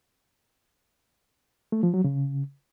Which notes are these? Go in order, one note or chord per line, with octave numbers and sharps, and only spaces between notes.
A3
F3
F#3
C#3